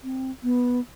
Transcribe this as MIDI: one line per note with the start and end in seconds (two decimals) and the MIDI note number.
0.04 0.30 60
0.43 0.80 59